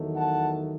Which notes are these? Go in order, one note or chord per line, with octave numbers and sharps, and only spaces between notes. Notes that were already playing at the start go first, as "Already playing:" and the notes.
Already playing: E2 D#3 F#3 A3 D#4
F#5 A5